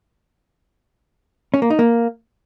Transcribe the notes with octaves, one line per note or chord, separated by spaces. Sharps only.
C#4
A#3
D#4
A#3